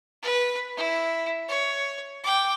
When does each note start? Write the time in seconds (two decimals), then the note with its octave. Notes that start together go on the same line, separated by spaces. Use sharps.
0.22 B4
0.77 E4
1.48 C#5
2.23 G5 D6